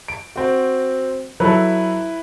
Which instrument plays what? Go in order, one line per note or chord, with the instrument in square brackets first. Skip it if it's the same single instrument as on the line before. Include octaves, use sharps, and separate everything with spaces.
[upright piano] D7
C4 F#4
[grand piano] F#3 A4 [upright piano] E4 B4